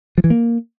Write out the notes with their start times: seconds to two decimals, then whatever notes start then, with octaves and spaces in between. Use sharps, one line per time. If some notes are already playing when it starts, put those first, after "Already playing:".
0.18 F3
0.24 E3
0.30 A#3